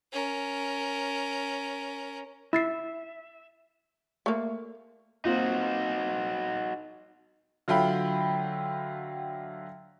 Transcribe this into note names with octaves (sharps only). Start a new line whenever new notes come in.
C#4 A#4
E4 E5 A6 C7
A3 A#3
A#3 C4 D#4 F4 F#4
D3 F#3 F4 E5 G5 B5